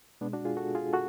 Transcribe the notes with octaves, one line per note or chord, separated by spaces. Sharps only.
B2 G#3 B3 D4
D4 F#4
F4 G#4
F#4 A4
F4 G#4
F#4 A4